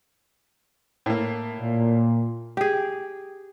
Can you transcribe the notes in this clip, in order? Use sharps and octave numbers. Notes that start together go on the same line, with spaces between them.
A2 A#3
A#2
G4 G#4